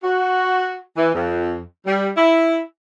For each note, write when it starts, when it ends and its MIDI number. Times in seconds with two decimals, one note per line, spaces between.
0.03 0.77 66
0.97 1.12 52
1.14 1.59 41
1.87 2.09 55
2.17 2.59 64